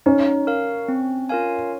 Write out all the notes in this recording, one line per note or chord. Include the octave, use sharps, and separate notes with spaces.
C#4 D#4
A#4 F5
C4
F4 A#4 F5 G#5